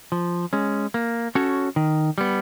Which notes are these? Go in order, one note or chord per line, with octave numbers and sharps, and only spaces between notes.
F3
G#3 C#4
A#3
C#4 F#4 A4 C#5
D#3
G3 B3